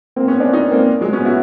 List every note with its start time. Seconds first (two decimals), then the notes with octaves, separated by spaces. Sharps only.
0.16 A#3 C4
0.28 B3 C#4
0.40 C4 D4
0.53 C#4 D#4
0.71 A#3 C4
1.01 F#3 G#3
1.13 B3 C#4
1.25 E4 F#4